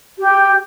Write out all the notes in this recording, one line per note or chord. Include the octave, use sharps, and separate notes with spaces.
G4